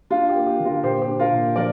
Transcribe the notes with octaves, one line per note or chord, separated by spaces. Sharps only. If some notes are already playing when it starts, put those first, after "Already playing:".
D4 F4
G4
A#3
G4
D3
F4 A#4
A#2 G4 C5
G4 C5
D4
F4 A#4
A#2
F3 A#4 D5